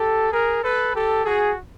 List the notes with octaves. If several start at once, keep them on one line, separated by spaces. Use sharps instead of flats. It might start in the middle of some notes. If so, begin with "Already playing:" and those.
Already playing: G4 A4
G#4 A#4
A4 B4
G4 A4
F#4 G#4